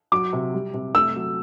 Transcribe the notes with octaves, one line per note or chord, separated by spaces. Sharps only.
F#3 D6
C3
G3
C3
A3 E6
F#3